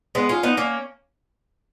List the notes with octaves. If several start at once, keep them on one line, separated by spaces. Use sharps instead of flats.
G#3 B3
C#4 F4
B3 D#4
A#3 C#4